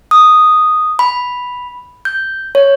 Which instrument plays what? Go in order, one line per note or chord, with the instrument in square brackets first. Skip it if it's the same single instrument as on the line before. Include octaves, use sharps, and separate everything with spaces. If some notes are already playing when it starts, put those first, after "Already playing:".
[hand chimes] D#6
B5
G6
C#5